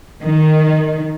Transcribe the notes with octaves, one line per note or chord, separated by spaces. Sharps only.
D#3